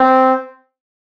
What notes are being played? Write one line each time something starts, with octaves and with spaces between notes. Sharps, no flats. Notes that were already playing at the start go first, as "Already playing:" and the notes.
Already playing: C4